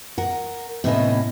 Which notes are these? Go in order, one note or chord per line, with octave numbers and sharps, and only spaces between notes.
A#4 F#5
A2 C3 B3 C#4 D#5 E5